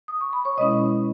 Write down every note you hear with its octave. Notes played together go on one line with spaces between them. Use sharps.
D#6
C#6
B5
C#5 C#6
B2 G#3 C#4 E4 D#5 D#6